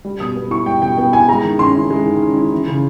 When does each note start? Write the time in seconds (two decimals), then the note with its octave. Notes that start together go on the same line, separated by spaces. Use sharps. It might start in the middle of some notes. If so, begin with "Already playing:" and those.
0.05 G3
0.20 B2 D#6
0.36 B3
0.51 E4 C#6
0.66 G3 G5
0.82 B2 G5
0.97 B3 G5
1.13 E4 G#5
1.28 G#3 A#5
1.44 D#3
1.59 C#4 C6
1.75 E4
1.90 G#3
2.06 D#3
2.21 C#4
2.37 E4
2.52 E3
2.67 C#3